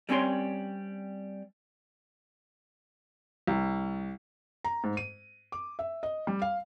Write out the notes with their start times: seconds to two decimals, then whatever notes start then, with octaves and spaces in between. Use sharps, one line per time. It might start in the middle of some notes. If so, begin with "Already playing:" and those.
0.09 G3 C4 C#4 C#5 C6
3.47 C2
4.64 A#5
4.84 G#2
4.97 D#7
5.52 D6
5.79 E5
6.03 D#5
6.27 G3
6.42 F5